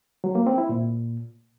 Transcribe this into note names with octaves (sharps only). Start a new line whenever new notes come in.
F#3
A#3
C4
E4
A#2